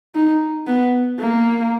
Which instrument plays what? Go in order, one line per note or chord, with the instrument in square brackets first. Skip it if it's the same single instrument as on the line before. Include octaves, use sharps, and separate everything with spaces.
[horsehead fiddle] D#4
B3
A#3